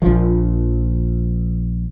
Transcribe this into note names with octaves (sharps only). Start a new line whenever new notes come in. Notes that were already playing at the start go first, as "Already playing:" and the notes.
A#1 F3